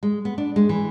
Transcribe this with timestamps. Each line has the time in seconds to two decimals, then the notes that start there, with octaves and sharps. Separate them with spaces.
0.03 G#3
0.25 B3
0.38 D4
0.56 G#3
0.69 E3